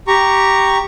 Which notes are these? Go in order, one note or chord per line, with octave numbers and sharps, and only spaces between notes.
G4 A#5 C#6